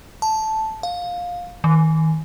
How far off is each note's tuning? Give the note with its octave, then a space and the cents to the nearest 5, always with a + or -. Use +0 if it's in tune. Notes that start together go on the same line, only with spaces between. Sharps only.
A5 -5
F5 +20
D#3 +35